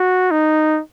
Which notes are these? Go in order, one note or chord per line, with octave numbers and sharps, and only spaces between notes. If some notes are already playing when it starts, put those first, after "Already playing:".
Already playing: F#4
D#4